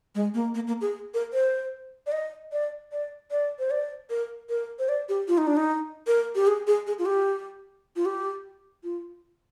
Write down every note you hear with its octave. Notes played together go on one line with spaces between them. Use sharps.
G#3
A#3
A#3
A#3
G#4
A#4
C5
D5
D#5
D5
D5
D5
C5
D5
A#4
A#4
C5
D5
G4
F4
D#4
D4
D#4
A#4
G4
G#4
G#4
G#4
F4
G4
F4
G4
F4